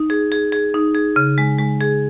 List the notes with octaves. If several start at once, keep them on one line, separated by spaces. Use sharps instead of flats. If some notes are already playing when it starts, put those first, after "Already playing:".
Already playing: D#4
G#4
G#4
G#4
D#4
G#4
C#3
G#3
G#3
G#4